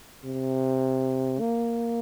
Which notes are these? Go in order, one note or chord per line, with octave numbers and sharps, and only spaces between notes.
C3
A#3